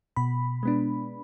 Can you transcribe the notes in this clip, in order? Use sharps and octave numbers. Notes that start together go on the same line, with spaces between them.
B2 B5
G#3 B3 D4